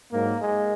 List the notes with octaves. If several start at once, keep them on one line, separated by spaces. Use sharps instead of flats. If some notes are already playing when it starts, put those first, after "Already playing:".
G#2 F#3 A#3
G#3